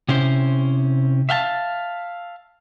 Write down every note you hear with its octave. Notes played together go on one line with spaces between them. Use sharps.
C3 C#4 E4 C5
E5 F5 G5 A5